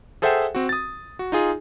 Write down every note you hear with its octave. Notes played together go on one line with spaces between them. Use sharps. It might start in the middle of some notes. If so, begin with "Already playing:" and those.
G#4 A4 C5 E5 F#5 G5
C4 F#4
D#6 A6
F#4
D#4 F4 G#4